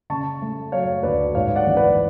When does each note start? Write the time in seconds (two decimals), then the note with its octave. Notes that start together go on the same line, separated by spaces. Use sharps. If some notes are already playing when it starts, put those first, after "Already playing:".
0.10 C#3 A5 C#6
0.42 A3
0.72 F#3 C#5 F5
1.03 D2 B4 D5
1.35 G#2 C#5 F5
1.55 D5 F#5
1.67 A1
1.77 B4 D5